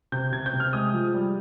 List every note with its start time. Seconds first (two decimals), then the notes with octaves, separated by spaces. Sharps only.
0.12 C3 G6
0.32 C3 G#6
0.46 G6
0.53 C3
0.60 F6
0.73 G#3 D#6
0.94 F3
1.14 G3